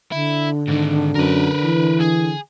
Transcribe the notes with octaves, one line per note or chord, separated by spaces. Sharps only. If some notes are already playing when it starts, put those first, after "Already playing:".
D3 E4
G#2 D#3
F#2 A#4 B4
E3
G#4